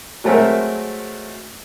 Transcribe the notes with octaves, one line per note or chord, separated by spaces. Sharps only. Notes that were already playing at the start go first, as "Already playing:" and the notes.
F#3 G#3 A3 C4 A#4 E5